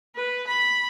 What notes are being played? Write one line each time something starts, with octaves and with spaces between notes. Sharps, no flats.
B4
B5